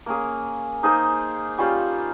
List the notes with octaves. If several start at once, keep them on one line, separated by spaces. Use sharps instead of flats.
A#3 C#4 G#4
A#3 D#4 G#4 C5
G3 C#4 F4 C5